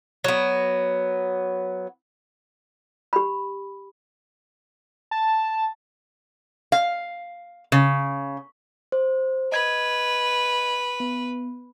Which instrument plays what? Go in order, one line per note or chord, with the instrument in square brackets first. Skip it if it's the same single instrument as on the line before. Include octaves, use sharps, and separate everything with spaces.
[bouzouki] F#3 B3
[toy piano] G4 B5
[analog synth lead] A5
[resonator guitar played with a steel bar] F5
C#3
[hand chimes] C5
[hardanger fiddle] B4 [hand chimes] D#5 G#6
[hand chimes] B3